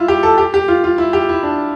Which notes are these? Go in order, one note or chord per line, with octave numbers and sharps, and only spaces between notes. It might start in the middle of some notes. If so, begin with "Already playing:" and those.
Already playing: E4 F4
G4
A4
G4
G4
F4
F4
E4
G4
E4
D4